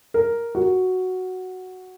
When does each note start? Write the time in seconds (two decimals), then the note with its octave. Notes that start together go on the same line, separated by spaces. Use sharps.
0.14 A#4
0.55 F#4